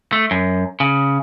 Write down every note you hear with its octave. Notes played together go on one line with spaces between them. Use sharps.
A3
F#2
C#3